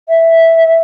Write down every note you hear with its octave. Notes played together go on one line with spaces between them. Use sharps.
E5